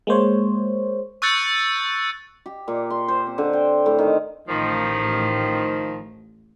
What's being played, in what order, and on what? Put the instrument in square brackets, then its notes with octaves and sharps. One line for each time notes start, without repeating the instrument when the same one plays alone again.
[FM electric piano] G#3 A#3 C5 C#5
[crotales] C#6 E6 F#6 G6 A6 C#7
[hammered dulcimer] G4
A#2
C6
C5
C4
D3
G5
A2
D#3
[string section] A1 [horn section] D#3 F3